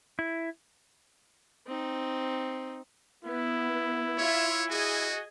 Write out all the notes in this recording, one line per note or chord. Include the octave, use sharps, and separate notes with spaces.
E4
C4 D#4
B3 E4
F4 C#5 E5
F#4 G#4 D#5 G#5